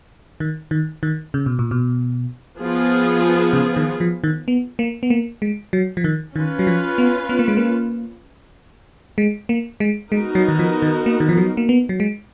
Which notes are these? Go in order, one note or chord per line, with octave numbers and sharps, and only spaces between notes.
D#3
D#3
D#3
C#3
B2
A#2
B2
F3 B3 F4 G#4
C#3
D#3
F3
D#3
B3
A#3
B3
A#3
G#3
F#3
F3
D#3
D#3 C#4 F4 B4
F#3
F3
B3
B3
A#3
G#3
A#3
G#3
A#3
G#3
G#3 B3 D#4 F#4 A#4
F#3
D#3
F3
D#3
A#3
D#3
F3
F#3
A#3
B3
F#3
G#3